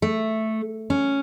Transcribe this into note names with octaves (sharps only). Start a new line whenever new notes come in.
A3
C#4